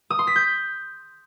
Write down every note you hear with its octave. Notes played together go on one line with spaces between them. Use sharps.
D#6
C6
B6
G6